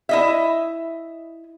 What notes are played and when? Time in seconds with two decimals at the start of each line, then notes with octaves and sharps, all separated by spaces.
0.09 E4 D#5 E5